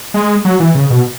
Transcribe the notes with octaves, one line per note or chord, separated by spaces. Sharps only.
G#3
F#3
E3
C#3
B2